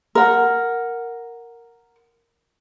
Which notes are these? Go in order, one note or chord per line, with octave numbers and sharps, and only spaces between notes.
A#4 F#5